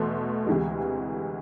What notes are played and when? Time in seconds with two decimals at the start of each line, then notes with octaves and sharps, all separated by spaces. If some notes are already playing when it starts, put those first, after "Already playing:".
Already playing: E2 B2 A3 C6
0.47 D2 C3 E3 G#3